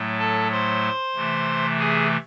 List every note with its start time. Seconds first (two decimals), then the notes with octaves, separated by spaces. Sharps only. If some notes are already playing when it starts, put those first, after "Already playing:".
Already playing: A2 F#3 A3
0.19 A4 A5
0.51 C5 C6
1.15 C3 E3 A3
1.79 G#4 G#5